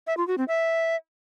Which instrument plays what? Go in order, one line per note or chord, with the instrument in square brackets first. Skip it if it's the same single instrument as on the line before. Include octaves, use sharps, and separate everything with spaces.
[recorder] E5
F4
F#4
C4
E5